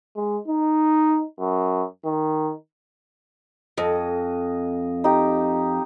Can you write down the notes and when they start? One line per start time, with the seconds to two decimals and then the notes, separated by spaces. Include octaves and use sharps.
0.16 G#3
0.48 D#4
1.40 F#2
2.05 D#3
3.78 F2 D#5
5.04 D#4 G4